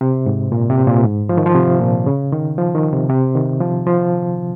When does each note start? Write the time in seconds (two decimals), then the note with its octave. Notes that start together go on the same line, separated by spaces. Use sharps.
0.01 C3
0.26 G#2
0.52 A#2
0.70 C3
0.87 A#2
1.04 G#2
1.29 F3
1.37 D#3
1.46 F3
1.55 C3
1.81 A#2
2.06 C#3
2.32 D#3
2.58 F3
2.75 D#3
2.93 C3
3.09 C3
3.35 D#3
3.60 F3
3.87 F3